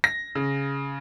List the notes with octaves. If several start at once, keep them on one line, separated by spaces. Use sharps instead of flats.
A#6
C#3